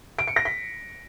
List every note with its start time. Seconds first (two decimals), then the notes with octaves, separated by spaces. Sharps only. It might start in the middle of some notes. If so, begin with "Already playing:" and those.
0.19 D7
0.27 C#7
0.36 A#6
0.45 B6